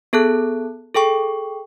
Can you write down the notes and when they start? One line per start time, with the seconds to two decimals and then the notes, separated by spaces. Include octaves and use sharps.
0.13 B3 G#4 A4 A5 F#6
0.95 G#4 A4 G5 C#6